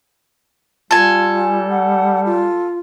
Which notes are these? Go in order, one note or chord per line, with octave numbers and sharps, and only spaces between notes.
G3 F4 A4 G#5
F#5
F4